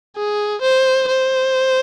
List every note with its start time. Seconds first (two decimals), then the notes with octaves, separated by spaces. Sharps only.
0.16 G#4
0.61 C5
1.08 C5